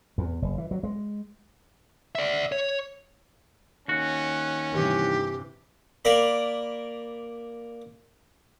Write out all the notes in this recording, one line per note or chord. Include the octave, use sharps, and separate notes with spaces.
E2
F#1
E3
F#3
G#3
D5 E5
C#5
D#2 C#4 F#4
G2 C3 E3 G4
A#3 A#4 D5 B5